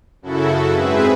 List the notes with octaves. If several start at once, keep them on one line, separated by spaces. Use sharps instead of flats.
F#2 C#3 E4 F#4 A4
G#2 C4 G#4 B4 E5